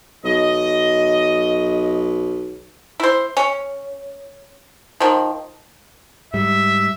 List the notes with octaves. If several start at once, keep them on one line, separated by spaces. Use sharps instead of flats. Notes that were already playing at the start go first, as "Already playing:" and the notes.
B1 D#5
E4 C5
C#4
D#3 F3
G#2 G3 E5